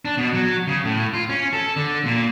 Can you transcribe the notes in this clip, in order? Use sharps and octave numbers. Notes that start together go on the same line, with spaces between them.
D4
B2
F#3
C#3
A2
F4
C#4
A4
D3
A#2